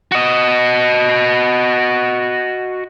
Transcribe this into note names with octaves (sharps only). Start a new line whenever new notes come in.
F#4 D#5